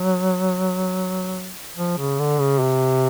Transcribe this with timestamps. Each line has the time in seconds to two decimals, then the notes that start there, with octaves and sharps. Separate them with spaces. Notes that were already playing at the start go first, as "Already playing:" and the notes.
Already playing: F#3
1.77 F3
1.98 C#3
2.19 D3
2.40 C#3
2.60 C3